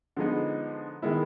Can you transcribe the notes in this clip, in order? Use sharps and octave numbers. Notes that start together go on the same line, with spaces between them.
D3 F3 G#3 B3 D#4
D#3 G#3 B3 E4